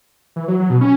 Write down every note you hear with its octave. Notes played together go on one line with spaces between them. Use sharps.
E3
F#3
F#3
B2
C#4